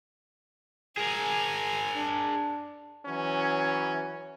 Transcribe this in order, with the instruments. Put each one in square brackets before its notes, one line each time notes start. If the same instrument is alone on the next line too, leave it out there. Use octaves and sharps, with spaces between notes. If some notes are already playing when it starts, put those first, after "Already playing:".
[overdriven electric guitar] G#4 A#4 [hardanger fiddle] G#5
[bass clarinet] D4
[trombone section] E3 F#3 C#4